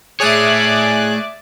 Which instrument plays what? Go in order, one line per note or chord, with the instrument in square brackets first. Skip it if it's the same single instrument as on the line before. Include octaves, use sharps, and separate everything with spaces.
[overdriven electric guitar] A3 C#5 [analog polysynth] G#4 G#5 F#6 [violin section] D5 E5 D6